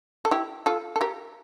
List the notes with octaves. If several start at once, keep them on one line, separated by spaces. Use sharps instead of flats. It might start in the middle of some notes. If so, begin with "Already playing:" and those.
A4
E4 G4
F4 A4
A4
G4 A#4